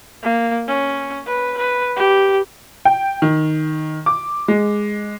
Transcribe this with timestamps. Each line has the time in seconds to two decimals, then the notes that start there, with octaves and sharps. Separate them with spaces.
0.23 A#3
0.67 C#4
1.27 B4
1.57 B4
1.96 G4
2.85 G5
3.22 D#3
4.06 D6
4.48 G#3